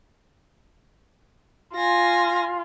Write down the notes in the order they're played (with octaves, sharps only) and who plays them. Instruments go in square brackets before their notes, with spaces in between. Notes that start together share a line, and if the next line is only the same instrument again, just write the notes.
[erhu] F4 [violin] G#5 A#6